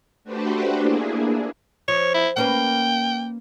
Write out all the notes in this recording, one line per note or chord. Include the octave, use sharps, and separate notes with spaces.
A3 D4 F#4 G4 B4 C5
A#3 D4 E4 G#4
F3 C#5
E4
A#3 C#4 B4 G5